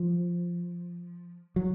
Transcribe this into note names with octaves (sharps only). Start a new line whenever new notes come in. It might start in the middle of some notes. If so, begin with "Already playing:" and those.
Already playing: F3
F#3